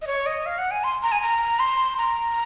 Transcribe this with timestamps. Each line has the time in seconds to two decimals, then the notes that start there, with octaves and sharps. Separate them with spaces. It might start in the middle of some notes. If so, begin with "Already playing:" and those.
0.02 D#5
0.07 C#5
0.26 D#5
0.46 F5
0.58 F#5
0.71 G#5
0.84 C6
1.03 A#5
1.12 G#5
1.22 A#5
1.59 C6
1.98 A#5